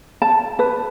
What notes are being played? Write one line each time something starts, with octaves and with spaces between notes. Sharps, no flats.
A5
B4